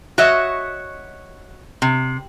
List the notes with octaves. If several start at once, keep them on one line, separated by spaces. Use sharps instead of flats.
F#4 C#5 D#5 E5
C3